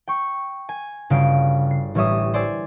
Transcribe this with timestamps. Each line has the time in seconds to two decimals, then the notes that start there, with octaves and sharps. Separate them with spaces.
0.08 G5 C#6
0.69 G#5
1.10 G1 C#3 F#4 F5 G5 D7
1.71 C7
1.95 A1 G3 C#5 E5 D#6
2.34 C5 D5 G#5 E6